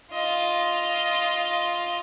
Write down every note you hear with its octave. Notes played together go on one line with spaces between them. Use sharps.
F4 D#5